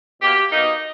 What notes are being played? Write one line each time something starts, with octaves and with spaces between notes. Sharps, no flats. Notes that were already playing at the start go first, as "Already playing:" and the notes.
B2 A#3 G4
B2 A#3 D#4